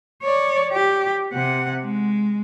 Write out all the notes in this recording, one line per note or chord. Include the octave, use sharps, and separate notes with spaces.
C#5 D5
G4
C3 F#5
G#3